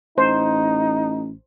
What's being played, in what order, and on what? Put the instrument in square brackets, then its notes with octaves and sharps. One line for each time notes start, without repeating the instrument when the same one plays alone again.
[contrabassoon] A1 [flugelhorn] D#4 [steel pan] C5